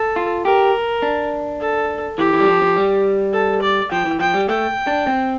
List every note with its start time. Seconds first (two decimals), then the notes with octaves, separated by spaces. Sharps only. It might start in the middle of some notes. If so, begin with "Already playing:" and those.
Already playing: A4
0.16 F4
0.45 G4 A#4
1.02 D4
1.60 A4
2.18 E3 G4
2.33 E3
2.40 G3
2.48 F3
2.62 F3
2.76 G3
3.33 A4
3.62 D5
3.92 F3 G5
4.05 E3
4.19 F3 G5
4.34 G3
4.49 A3 G5
4.87 D4
5.07 C4